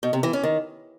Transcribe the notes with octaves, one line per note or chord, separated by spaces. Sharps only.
B2
C3
E3
C#4
D#3